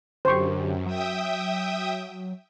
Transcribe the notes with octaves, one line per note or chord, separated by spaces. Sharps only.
F#2 D3 G4 C5 C#6
F#3 E5 G5 D#6